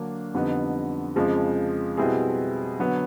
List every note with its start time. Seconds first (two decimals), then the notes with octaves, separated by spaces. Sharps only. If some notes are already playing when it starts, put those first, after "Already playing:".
Already playing: D3 F#3 A#3 D4
0.34 F2 D3 G3 B3 D#4
1.16 F2 C#3 F3 G#3
1.97 B2 G3 C4 E4 G#4
2.79 D3 F#3 B3